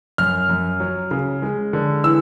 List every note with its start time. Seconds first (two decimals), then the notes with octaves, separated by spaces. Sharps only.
0.18 F#2 F6
0.49 F#2
0.80 F#3
1.11 C#3
1.42 G#3
1.73 D3
2.04 E3 E6